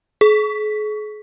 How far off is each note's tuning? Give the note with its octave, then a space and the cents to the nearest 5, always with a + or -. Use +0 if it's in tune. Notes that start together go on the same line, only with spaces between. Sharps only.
G#4 +40